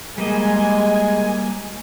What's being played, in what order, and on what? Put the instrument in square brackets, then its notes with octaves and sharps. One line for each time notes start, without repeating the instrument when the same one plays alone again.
[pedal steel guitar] G3 A#3 D#5 [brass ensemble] G#3 [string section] G#5